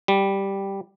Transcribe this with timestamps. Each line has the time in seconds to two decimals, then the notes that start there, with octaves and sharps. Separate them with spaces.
0.08 G3